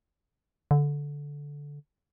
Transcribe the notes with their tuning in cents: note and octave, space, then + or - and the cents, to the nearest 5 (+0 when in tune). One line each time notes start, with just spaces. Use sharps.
D3 -15